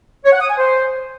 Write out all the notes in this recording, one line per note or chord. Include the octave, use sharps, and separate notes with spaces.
C#5
F#5
D#6
G#5
C5